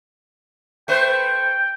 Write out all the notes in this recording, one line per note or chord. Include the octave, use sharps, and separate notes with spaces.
A3 B4 C5 G5